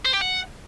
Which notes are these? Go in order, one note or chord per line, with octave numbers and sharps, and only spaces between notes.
C5
G4
F#5